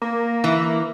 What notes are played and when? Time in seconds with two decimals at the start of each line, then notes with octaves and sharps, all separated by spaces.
0.02 A#3
0.44 E3